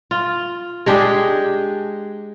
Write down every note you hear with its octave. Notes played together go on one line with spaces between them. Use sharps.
F4
G#3 D4 G4 G#4